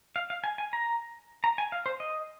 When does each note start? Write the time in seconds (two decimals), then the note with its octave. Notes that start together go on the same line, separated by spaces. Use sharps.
0.16 F5
0.30 F5
0.44 G#5
0.58 G#5
0.73 A#5
1.44 A#5
1.58 G#5
1.72 F5
1.86 C5
2.00 D#5